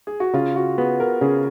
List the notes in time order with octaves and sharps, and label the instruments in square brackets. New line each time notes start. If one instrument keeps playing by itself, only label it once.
[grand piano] G#4
F#4
[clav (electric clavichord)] C#3 [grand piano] F4
[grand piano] F#4
[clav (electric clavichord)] B3 [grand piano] G#4
[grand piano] A#4
[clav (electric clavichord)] C#3 [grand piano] G#4